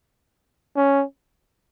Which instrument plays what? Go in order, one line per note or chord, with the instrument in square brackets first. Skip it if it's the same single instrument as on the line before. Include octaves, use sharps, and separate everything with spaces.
[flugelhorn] C#4